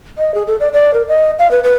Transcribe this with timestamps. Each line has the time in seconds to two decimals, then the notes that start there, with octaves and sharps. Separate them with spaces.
0.18 D#5
0.34 G#4
0.47 A4
0.60 D5
0.73 D5
0.94 A#4
1.08 D#5
1.39 F5
1.51 B4
1.64 B4